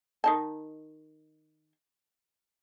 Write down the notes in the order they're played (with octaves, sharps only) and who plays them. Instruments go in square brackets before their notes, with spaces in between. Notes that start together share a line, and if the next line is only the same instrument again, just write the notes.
[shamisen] D#3 D#4 A5